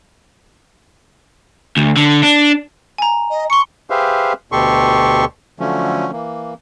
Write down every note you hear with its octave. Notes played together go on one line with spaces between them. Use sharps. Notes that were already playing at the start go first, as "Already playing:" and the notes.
D2
D3
D4
G#5 A#5
D#5
C6 C#6 C#7
G4 G#4 B4 C5 E5 F5
D2 B2 G4 A4 C6 C#6
D3 F3 F#3 A3 C#4
E3 A#3